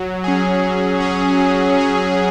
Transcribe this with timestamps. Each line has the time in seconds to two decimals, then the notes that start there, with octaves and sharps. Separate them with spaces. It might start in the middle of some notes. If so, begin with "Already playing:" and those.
Already playing: F#3
0.24 C#4 G#4
0.62 F#3
1.00 C#4 G#4
1.39 F#3
1.77 C#4 G#4